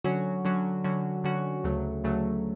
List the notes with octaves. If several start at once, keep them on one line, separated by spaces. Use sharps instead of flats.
D3 F#3 C#4 F#4
D3 F#3 C#4 F#4
D3 F#3 C#4 F#4
D3 F#3 C#4 F#4
D2 C#3 F#3 A3
D2 C#3 F#3 A3